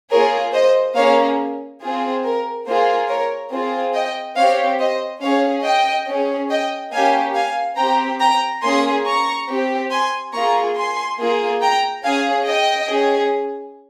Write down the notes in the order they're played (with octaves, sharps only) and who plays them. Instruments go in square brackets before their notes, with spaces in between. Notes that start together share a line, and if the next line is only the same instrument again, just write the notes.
[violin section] A#3 F4 G#4 A#4 C#5
C5 D#5
A#3 C#4 G#4 C#5 F5
C4 F4 G#4
A#4
A#3 F4 G#4 C5
A#4 C#5
C4 F4 G#4
D#5 G5
C4 G4 C#5 F5
C5 D#5
C#4 G#4 C#5 F5
D#5 G5
C#4 G#4
D#5 G5
A#3 C#4 G4 F5 G#5
F5 G#5
C4 G4 G5 A#5
G5 A#5
A#3 C#4 G#4 G#5 C6
A#5 C#6
C4 G4
G#5 C6
A#3 F4 G#4 A#5 C#6
G#5 C6
A#3 F4 G#4
G5 A#5
C#4 G#4 F5 G#5
D#5 G5
C#4 G#4